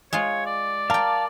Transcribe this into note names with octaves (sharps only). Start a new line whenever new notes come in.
G#3 F4 C#5
D5
A#4 F5 G5 A5